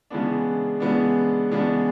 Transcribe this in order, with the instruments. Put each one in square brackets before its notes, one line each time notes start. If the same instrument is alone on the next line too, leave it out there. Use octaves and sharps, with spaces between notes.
[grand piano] C#3 E3 G#3 B3 D4
C#3 E3 G#3 B3 D4
C#3 E3 G#3 B3 D4